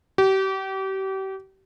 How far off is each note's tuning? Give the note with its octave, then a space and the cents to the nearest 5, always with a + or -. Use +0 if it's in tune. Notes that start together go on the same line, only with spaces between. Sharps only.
G4 -35